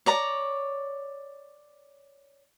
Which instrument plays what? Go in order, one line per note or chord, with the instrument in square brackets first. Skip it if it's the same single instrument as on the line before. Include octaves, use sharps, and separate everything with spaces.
[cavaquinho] C#5 D5 A#5